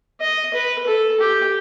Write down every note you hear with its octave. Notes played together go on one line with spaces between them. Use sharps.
D#5
B4
A4
G4